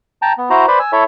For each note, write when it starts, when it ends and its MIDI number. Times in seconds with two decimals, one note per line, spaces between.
0.22 0.33 79
0.22 0.33 81
0.22 0.33 82
0.38 0.49 59
0.50 0.66 64
0.50 0.66 66
0.50 0.66 72
0.50 0.66 82
0.68 0.79 71
0.68 0.79 72
0.68 0.79 74
0.68 0.79 83
0.79 0.92 80
0.79 0.92 88
0.93 1.04 64
0.93 1.04 69
0.93 1.04 73
0.93 1.04 76